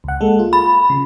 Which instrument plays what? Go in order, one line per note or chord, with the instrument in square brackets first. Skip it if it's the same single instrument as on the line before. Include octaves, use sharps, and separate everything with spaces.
[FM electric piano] C#2 F#5
G#3 A#3 A4
F4
[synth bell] B5
[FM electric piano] C#3